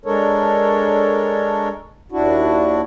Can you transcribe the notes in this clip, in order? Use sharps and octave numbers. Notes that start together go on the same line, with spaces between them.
G#3 D4 A4 A#4 C#5
D#2 D4 E4 F#4